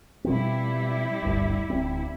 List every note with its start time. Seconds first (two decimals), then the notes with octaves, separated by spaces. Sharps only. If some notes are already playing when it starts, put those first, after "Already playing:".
0.24 B2 F3 G3 C4 E4
1.23 D1 G1 D2
1.70 D1 D2 C4